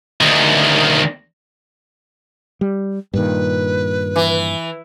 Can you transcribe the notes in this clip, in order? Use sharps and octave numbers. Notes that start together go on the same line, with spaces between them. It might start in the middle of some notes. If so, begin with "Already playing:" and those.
D2 D#3
G3
G2 A#2 D#3 B4
E3